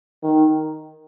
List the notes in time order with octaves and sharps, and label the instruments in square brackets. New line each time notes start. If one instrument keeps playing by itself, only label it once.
[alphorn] D#3